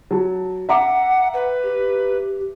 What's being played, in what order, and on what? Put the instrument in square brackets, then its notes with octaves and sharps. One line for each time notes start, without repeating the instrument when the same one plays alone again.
[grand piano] F#3 A5
[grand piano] E5 A#5 D6 [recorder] F#5
[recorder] B4
[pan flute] G4